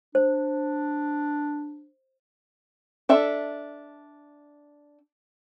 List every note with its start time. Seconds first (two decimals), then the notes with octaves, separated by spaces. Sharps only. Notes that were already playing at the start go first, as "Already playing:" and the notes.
0.15 D4 C5
3.09 D4 A4 E5